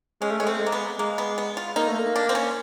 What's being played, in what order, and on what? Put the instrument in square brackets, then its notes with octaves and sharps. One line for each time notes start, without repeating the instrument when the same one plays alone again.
[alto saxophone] G#3 [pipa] C#4
[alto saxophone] A3
[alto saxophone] G#3 [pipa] C#4
[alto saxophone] A3 [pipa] C4
[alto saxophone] G#3
[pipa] A#3
B3
[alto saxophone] G#3 [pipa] A#3
[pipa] B3
B3
F4
[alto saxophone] A#3 [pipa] D#4
[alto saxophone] A3
A#3
[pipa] D4
C4
C#4